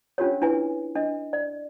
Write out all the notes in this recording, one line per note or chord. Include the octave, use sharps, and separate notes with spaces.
C#4 D4 F4 G4 A#4 C#5
D4 E4 B4 G#5
D4 D#5
D5